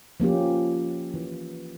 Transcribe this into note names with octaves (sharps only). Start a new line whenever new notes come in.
F3 A#3 C#4 G4
E3